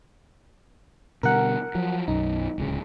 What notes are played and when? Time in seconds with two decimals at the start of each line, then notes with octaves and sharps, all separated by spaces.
1.23 B2 D3 G3 A#4 F#5
1.75 F3 F#3
2.08 B1 F#2 D#4
2.58 D1 C#2 C#3